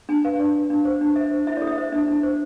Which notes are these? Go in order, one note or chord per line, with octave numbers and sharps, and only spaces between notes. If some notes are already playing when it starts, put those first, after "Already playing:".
D4 G#5
B4 F5
D4 D5
D4
D4
C5
D4
C5 E5
C5
E4 E5
D5
A4
E5
C5 E5
D4 E5
D4
C5